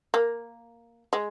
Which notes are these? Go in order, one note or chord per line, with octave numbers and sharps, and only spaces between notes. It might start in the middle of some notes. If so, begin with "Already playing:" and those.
A#3
G#3